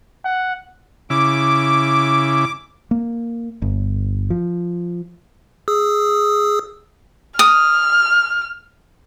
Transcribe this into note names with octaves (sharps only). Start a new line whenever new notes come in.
F#5
C#3 E4 D6
A#3
G1
F3
G#4 D#6 E6
D#6 F6